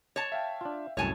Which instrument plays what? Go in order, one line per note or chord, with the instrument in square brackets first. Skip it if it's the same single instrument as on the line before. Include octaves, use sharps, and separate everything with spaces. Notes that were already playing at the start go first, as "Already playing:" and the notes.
[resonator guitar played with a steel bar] C#5 A5
[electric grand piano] E5 F5 G5
[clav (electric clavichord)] D4 F4
[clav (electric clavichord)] C2 F#2 [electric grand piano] A2 [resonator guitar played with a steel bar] C#5 G#5 A5